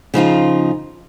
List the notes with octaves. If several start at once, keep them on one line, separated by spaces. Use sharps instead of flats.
C#3 F3 D#4 F4